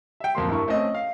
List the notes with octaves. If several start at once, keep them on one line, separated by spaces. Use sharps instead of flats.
E5 G5
D1 F2 A#3 C6
G2 E4 A#4 C#6
A3 C4 C#4 D#5
F5